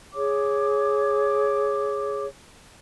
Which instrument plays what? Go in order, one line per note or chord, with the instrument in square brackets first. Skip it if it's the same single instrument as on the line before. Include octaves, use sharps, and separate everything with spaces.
[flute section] G#4 C#5 D6